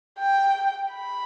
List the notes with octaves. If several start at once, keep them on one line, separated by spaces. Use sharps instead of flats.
G5
B5